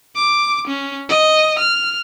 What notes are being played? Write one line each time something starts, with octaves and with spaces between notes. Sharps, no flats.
D6
C#4
D#5
F6